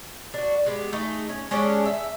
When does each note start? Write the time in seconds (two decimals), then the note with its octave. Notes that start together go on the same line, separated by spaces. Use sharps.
0.34 D4 F#4
0.66 G#3 B3 G4
0.92 A3 D#4 G#4
1.29 C#4
1.51 G#3 C#4 D4 G4
1.85 E5